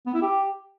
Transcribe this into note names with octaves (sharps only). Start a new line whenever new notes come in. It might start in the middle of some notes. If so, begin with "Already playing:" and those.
B3
E4
G4